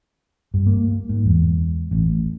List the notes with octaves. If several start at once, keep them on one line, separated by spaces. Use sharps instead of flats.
G2
A#3
G#2
E2
A1